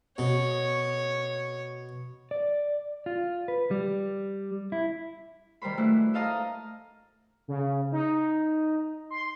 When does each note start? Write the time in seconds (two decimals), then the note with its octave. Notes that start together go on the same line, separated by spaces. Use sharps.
0.18 B2 C#5
2.31 D5
3.06 F4
3.48 B4
3.71 G3
4.72 E4
5.62 D#3 G3 A#4 C5 B5
5.77 A3 D4 E4 F#4
6.14 A4 D#5 F5 A5 A#5 D#6
7.48 C#3
7.92 D#4
9.10 C6